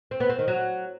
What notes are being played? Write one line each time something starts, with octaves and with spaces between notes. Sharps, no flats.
C4
B3
C4
D#3
F#3